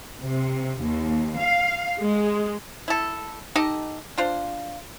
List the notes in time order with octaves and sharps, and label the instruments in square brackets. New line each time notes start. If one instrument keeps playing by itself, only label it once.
[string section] C3
D#2
F5
G#3
[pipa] E4 A4
D#4 G4 A4 D#5
D4 F4 C5